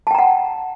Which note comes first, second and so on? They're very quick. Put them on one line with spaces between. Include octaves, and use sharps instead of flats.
A5 G5 A#5 F#5